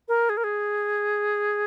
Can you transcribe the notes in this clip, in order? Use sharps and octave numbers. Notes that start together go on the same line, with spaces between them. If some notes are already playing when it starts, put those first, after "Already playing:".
A#4
G#4
A#4
G#4